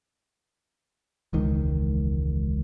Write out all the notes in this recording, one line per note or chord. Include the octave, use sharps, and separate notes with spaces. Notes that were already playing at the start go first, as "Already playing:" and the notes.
E1 C#2 D#3